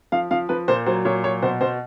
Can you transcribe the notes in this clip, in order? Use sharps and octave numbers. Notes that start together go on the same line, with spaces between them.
F3 F5
F3 F5
F3 B4
A#2 C5
F#3 C5
A#2 C#5
F#3 C#5
B2 C5
B2 C5